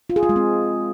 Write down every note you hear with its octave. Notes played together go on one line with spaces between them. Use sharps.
F4
G#4
F4
G#3
C4